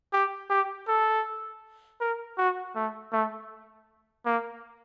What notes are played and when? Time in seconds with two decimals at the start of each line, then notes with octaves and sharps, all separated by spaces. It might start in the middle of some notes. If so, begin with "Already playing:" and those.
0.13 G4
0.50 G4
0.88 A4
2.00 A#4
2.38 F#4
2.75 A3
3.13 A3
4.26 A#3